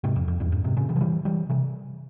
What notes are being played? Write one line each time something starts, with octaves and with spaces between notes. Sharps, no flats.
G#2 C3
F2
F2
E2 G2
F2 G#2
G#2 C3
A#2 C#3
C3 E3
F3
E3 G3
E3 G3
C3 E3